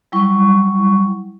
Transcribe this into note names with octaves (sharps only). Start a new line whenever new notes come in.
F#3 G3 E4 C#6